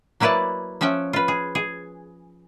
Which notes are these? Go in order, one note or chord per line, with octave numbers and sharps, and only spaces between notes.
F#3 A#3 E4 B4 D5 A5
F3 C#4 E5 F#5 G5
F4 B4
G#4
G#4